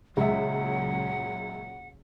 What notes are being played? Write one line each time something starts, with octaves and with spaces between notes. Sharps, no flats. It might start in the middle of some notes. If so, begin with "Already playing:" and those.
C#2 A#2 C#3 F#3 G#3 E5 F#5